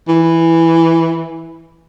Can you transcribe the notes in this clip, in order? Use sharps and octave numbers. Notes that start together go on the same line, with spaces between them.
E3